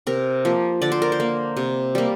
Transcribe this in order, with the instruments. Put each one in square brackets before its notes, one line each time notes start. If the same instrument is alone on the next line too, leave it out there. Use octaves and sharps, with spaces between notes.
[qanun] C3 A#4
F3 A#3
D3 D5
C5
A#4
C5
A#3
C3
G3 A#3